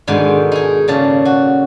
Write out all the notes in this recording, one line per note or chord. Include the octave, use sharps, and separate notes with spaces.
G#2 B2 D3 D#3 C5
D#4 G#4
A#2 C#3 A5
F#4